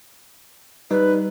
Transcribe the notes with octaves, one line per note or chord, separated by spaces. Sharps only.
G3 D#4 B4